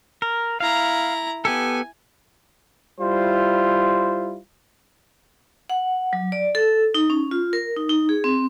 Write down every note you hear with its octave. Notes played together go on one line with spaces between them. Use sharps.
A#4
E4 F5 A#5
B3 G4 A4 G#5
G3 E4 F4 C5
F#5
F#3
D5
A4
D#4
C#4
F4
A#4
D#4
D#4
G#4
C4